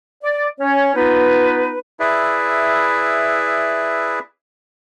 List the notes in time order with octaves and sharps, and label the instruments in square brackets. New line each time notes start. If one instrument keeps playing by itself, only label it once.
[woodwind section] D5
C#4 C#5
B3 D#4 F4 B4
[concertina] E4 G#4 B4 D5 E5